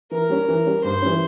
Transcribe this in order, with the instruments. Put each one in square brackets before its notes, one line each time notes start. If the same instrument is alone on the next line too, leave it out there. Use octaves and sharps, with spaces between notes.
[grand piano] E3 [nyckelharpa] A#4
[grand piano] G3 C#4
E3
G3 C#4
[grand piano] G2 [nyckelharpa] C5
[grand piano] E3 G3 C#4